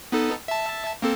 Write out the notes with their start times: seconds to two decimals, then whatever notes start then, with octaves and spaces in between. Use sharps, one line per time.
0.12 B3 D#4 A4
0.48 E5 A5
1.02 A#3 C4 A4